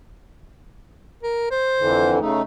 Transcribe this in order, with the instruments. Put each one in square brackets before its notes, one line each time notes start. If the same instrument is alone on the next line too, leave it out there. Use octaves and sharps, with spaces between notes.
[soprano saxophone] A#4
C5
[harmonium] F2 D3 E3
C#3 A3 D#4